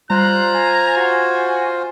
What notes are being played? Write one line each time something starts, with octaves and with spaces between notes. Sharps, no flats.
G3 F4 C5 A#5 F#6
G#5 G#6
F#4